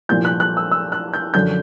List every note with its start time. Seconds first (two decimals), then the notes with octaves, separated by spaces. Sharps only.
0.09 C2 A#2 F3 G6
0.25 F#6
0.40 F#6
0.57 E6
0.71 E6
0.92 F#6
1.14 G6
1.34 F#2 D3 F3 G6